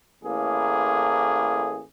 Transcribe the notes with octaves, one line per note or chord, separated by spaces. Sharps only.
A1 A2 A#3 G#4